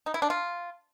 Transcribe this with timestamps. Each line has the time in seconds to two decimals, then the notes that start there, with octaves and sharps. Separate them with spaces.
0.06 D#4
0.14 E4
0.22 D4
0.30 F4